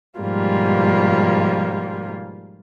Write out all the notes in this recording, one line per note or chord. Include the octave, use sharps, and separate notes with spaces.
G#2 B2 F3 G3 A#3 F4